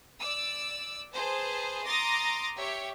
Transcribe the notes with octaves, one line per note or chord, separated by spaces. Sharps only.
D5 E6
G#4 B4 C5 A5
A#5 C6 D6 D#6 A6 A#6
G4 C#5 E5